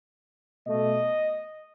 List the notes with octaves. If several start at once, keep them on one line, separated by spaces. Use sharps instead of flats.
B2 A3 D#5